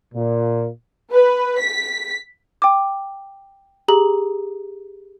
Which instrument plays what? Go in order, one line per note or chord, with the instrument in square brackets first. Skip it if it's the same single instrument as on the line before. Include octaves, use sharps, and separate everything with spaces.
[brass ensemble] A#2
[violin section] B4
B6
[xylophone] G5 D6
G4 G#4 A#5 F#7